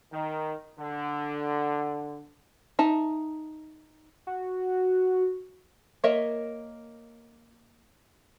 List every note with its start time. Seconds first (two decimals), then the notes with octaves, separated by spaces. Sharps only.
0.12 D#3
0.79 D3
2.79 D#4 E5 A5
4.27 F#4
6.04 A#3 A#4 C#5 D#5 E5